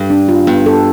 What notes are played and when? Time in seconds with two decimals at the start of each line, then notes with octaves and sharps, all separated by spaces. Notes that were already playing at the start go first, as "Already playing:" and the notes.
Already playing: G2
0.10 D4
0.28 F4
0.47 G2 B3
0.66 A4